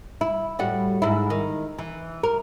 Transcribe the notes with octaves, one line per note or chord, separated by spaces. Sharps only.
E4
A2 G3 F#4
G#2 E4
D#3
E3
A#4